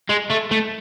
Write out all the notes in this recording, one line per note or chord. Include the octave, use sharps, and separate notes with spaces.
G#3
A3
A3